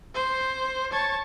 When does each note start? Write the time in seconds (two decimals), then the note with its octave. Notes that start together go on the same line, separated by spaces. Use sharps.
0.15 C5
0.92 C#5 A5